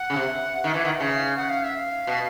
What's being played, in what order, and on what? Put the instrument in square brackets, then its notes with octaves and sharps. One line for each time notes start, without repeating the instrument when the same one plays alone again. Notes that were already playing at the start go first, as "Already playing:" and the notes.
Already playing: [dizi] F#5
[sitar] C#3
C3
D#3
E3
D#3
C#3
[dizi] F#5
F5
E5
F5
[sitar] B2